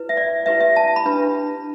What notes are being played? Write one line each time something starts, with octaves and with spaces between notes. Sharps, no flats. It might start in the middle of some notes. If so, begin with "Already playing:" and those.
Already playing: E4 B4
E5
D5
E4 G4 B4 E5
E5
A5
B5
D4 G4 B4